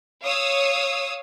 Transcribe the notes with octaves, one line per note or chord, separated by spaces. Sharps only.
C#5 F5 D#6 E6